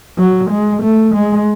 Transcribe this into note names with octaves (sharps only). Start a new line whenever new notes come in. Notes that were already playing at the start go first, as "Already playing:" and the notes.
F#3
G#3
A3
G#3